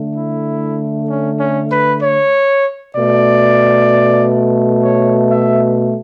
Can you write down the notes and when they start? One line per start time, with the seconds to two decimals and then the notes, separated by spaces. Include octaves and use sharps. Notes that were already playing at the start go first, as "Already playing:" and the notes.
Already playing: D3 A3
0.14 E4
1.08 C#4
1.39 C#4
1.70 B4
2.01 C#5
2.95 B2 A3 D5
4.82 C#5
5.29 E5